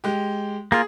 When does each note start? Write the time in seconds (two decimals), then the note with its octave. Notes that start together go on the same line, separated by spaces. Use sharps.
0.04 G#3 G4
0.72 A#3 F4 G#4